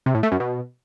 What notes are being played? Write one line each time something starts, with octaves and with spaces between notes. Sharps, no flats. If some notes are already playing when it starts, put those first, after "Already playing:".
C3
A2
A3
F#2
B2